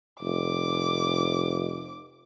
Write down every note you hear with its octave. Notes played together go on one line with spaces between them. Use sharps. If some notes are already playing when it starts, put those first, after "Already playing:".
F1 D6